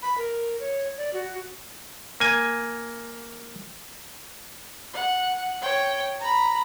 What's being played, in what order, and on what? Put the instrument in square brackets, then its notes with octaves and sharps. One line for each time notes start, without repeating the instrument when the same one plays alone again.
[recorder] B5
A#4
C#5
D5
F#4
[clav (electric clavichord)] A#3 G#5
[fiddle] F#5
C#5 G5
A#5 B5